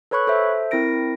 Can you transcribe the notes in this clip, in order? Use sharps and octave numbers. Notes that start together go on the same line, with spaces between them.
A4 B4 C#5 B5 C#6 F#6
A4 C5 E5
C4 E4 A#4 A#6 D7